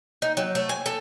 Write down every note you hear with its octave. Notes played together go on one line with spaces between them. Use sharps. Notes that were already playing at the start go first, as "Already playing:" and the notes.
D#4
F#3
A3
G#5
A4